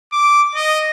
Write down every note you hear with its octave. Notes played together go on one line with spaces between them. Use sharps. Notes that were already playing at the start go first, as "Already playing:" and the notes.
D6
D#5